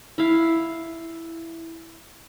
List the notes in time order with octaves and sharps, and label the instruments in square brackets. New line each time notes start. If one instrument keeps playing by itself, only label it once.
[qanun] E4 F5